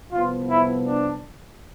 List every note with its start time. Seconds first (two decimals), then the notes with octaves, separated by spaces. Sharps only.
0.12 C2 C3 F3 B3 F4
0.49 E4
0.86 D4